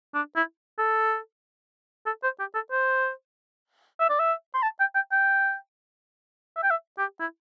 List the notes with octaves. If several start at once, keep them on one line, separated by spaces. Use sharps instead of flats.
D4
E4
A4
A4
C5
G4
A4
C5
E5
D5
E5
C6
A5
G5
G5
G5
E5
G5
E5
G4
E4